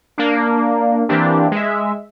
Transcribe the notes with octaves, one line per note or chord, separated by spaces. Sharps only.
A#3 D4
E3 A#3 C4 D4 G4
G#3 E5